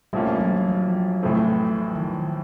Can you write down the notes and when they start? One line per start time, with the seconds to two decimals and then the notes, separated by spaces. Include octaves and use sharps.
0.13 A#1 A2 F3 G3 A#3 C#4
0.41 F#3
0.68 F3
1.23 A1 A2 E3 A3 C4
1.77 F3
1.96 D#3
2.14 D#3